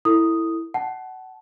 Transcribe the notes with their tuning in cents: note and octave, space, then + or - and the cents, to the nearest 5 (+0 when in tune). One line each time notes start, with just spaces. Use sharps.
E4 +0 A4 +25 D#6 +0
F#5 +25 A5 -20